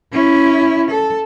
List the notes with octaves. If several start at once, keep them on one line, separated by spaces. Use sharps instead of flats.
C#4 E4
A4